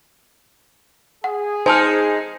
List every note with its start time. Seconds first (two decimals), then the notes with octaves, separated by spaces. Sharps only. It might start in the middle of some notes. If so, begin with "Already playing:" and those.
1.24 G#4 F#5
1.66 G#3 D#4 C5 G#5 A5 F6